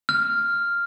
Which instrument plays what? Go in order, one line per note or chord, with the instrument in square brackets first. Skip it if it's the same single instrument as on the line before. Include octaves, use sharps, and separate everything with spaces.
[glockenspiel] F6